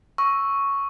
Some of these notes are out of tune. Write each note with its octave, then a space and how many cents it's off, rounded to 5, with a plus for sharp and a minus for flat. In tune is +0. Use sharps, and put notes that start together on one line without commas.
C#6 +0 E6 +0